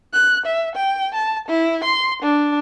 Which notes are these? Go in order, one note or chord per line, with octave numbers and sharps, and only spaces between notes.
F#6
E5
G5
A5
E4
C6
D4